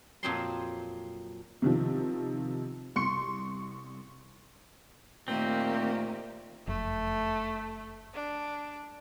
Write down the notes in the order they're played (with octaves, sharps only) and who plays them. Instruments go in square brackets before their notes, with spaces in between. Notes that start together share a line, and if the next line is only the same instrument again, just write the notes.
[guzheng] F2 A#2 F3 F#3 C4 C6
[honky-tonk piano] C3 D#3 F3
C2 C6 C#6 C#7
[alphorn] A#2 [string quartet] D#3 A#3 G4 [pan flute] A3 [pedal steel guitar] C4
[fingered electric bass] F#1 F2 [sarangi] A3
[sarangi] D4